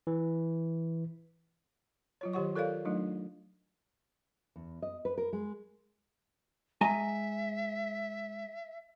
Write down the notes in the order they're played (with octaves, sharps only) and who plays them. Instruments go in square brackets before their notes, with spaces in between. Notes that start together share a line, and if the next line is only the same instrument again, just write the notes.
[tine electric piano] E3
[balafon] F#3 F4 C#5
D#3 F#3 G4 C#5 F#5 C#6
F4 A4 A#4 C#5 D5 F5
F#3 A3 D4 D#4 F4
[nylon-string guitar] E2
D#5
B4
A#4
G#3
[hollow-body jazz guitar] G#3 G#5 A#5 [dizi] E5